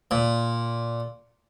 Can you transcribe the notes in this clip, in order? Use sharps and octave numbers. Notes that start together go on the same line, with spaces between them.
A#2